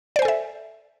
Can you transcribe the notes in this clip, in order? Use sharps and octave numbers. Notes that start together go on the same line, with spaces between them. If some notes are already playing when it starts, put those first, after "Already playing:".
A4 C5 D5 E5 G#5